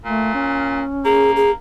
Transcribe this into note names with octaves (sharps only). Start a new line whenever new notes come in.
A#2 A3
C#4
A#3 G#4
G#4